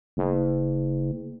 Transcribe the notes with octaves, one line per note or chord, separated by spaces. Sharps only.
F#1